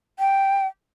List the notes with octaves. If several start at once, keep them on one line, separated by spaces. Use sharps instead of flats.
G5